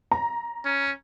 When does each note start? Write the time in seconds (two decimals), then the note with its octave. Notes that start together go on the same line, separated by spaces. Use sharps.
0.12 A#5
0.65 C#4